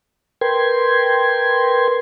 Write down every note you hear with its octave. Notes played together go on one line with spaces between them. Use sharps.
A#4 B4 G5 C6 G#6